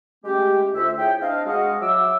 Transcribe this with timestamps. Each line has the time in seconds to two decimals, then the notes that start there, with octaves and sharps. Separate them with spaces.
0.24 G#3 A3 C#4 G4
0.74 D2 F4 C5 E5
0.97 E4 G#4 C#5 G5
1.20 C4 D4 D#5 F5
1.46 G#3 F#4 G#4 D#5 F5 F#5
1.80 F#3 E5 D6 E6